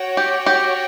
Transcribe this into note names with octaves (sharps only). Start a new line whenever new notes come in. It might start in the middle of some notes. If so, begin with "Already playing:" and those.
Already playing: F#4 C#5 G5
G4
G4